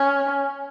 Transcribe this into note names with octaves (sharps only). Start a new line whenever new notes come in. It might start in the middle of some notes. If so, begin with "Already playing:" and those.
Already playing: C#4